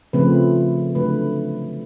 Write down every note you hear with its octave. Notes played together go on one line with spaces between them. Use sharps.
C#3 F3 A3 C4 B4
D3 F#3 A3 B4